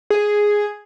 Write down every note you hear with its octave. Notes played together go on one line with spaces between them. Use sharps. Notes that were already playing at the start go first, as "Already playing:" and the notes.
G#4